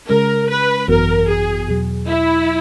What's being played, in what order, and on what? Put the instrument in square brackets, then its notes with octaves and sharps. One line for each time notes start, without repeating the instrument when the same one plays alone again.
[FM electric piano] C#3 G#3 C#4 [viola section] A#4
[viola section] B4
[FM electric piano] G#1 F#2 E3 B3 F#4 [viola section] A#4
[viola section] G#4
[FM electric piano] E2 B2 F#3
[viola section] E4